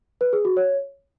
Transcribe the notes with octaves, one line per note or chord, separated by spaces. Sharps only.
B4
G#4
F#4
C#5